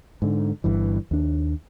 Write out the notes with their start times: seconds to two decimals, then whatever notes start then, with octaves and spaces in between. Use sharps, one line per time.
0.22 G#2 D3
0.64 G1 G2 E3
1.11 D#2 D4